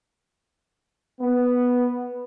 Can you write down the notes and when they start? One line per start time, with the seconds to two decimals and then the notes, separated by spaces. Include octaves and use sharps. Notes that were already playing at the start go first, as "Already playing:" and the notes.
1.20 B3